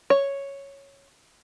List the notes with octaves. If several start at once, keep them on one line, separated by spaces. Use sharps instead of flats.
C#5